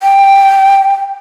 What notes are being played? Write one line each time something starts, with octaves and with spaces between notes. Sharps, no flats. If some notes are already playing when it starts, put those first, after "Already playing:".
G5